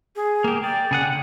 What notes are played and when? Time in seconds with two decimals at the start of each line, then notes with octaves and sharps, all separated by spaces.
0.16 G#4
0.44 A#3 G4
0.64 D5 G5
0.91 C#3 G#4 F#5
1.06 D3 F#5